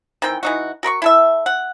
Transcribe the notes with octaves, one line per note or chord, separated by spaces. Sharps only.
D#3 E3 C4 G5
E3 D#4 F#4
F#4 A#4 B5 C#6
E4 A4 E5
F#5